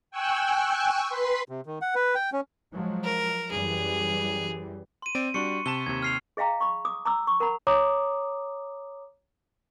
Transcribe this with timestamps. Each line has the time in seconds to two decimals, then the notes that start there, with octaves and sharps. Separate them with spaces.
0.11 G5 G#5 C#6 E6 F#6
1.07 B4 C6 B6
1.48 C3
1.66 D#3
1.82 F#5
1.95 B4
2.15 G5
2.33 C#4
2.72 F3 F#3 G#3
3.04 A#4
3.51 F#2 E3 G3 G#4
5.02 C6 D#7
5.15 C4 D5 D7
5.34 G3 D4 F#4 C6 C#6 C#7
5.66 C3 A5 E7 G7
5.86 D#2 C3 G#6
6.02 F6 C7 F7
6.37 G#4 D#5 F5 G5 A#5
6.60 B5 C#6
6.85 D6 D#6
7.05 A#5 D6 E6
7.27 C#6
7.40 A#4 F#5 A#5 B5
7.67 C#5 A#5 D6 D#6